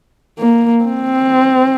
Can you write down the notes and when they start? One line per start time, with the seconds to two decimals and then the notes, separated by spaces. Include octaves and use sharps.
0.39 A#3
0.84 C4